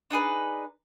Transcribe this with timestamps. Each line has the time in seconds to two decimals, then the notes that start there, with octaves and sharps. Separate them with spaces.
0.10 D4 D#4 G#4 B4